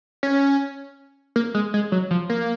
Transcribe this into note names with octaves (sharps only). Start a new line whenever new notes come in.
C#4
A#3
G#3
G#3
F#3
F3
A#3